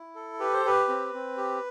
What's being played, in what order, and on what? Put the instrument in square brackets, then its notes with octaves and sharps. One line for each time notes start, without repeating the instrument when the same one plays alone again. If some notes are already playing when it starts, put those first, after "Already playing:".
Already playing: [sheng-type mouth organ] E4
A4
G4 B4
C5
G4 B4
C4
C4
G4